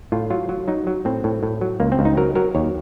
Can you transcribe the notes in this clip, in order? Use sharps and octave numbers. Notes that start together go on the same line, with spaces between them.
A2 F4
F#3 F4
F#3
F#3 D#4
F#3
A2 C4
A2
A2
F#3
C#2 A#3
C4
C#2
D#4
F#3 A#4
F#3 A#4
D#2 C#5